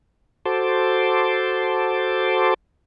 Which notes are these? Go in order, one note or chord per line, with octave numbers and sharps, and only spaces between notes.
F#4 A4 C5 A5 C6 D6